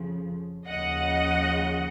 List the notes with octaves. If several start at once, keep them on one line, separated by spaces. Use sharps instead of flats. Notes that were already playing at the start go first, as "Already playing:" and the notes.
Already playing: F2 C#3 F3
D#2 C#3 F3 D#5 F#5